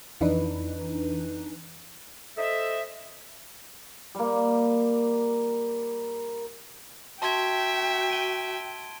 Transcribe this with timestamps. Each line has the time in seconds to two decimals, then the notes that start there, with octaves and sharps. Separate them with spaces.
0.21 F2 E3 D4 D#4 B4
2.37 A4 C5 D#5 E5
4.15 G3 A#3
7.22 F#4 E5 G5 A5 C6 G#6
8.10 D7 D#7 G7